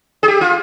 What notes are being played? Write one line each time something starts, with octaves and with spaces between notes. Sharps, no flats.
G#4
G4
F4